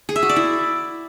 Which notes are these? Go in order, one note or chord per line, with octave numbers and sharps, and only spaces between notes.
G#4
E5
F#4
D5
E4